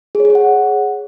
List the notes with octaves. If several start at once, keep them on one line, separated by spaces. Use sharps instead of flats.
G#4
C#5
G#4
C#5
F#5